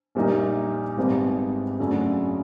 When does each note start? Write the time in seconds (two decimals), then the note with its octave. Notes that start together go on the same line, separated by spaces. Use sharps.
0.15 A#1 A#2 G3 A#3 D#4
0.97 G#1 G#2 D#3 G3 B3
1.79 F#2 C#3 F#3 A3 D4